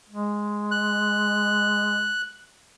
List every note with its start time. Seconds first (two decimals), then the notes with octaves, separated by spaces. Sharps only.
0.09 G#3
0.71 F#6